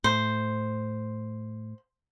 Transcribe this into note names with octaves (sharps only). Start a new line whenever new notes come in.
A2 C5